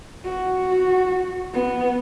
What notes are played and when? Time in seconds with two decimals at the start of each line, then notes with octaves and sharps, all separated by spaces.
0.25 F#4
1.53 B3